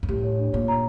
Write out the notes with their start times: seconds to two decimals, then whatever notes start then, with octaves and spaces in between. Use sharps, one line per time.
0.03 G2
0.09 A2 G4
0.24 C#5
0.39 D4
0.53 A#2 C#5
0.68 A#5